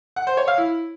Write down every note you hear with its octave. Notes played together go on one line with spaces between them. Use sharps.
F#5
C5
C#5
F5
E4